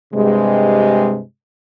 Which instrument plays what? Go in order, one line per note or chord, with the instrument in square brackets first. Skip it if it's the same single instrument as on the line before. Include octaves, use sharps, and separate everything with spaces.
[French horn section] G2 C3 G#3